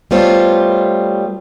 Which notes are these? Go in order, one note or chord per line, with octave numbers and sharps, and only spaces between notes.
G3 A3 B3 F4 C5 C#5